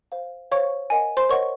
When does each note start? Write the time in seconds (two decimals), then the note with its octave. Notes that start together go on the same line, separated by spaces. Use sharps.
0.12 C5 F5
0.51 C5 C#5 F5 C#6
0.90 A#4 D#5 F#5 G#5
1.17 C5 C6
1.29 A#4 C#5 D#5 F#5 C#6